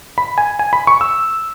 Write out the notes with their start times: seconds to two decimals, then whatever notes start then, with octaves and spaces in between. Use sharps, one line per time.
0.18 B5
0.38 G#5
0.59 G#5
0.73 B5
0.87 C#6
1.01 E6